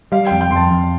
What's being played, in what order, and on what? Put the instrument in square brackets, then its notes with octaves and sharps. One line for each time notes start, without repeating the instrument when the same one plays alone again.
[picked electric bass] G3 [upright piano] F5
[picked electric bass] F2 [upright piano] G5
[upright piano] G5
[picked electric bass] F2 [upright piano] C6
[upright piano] A5
[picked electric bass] F2